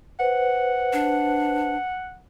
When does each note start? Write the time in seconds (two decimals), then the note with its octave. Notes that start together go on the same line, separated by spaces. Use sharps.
0.20 B4 C5 F#5
0.93 D4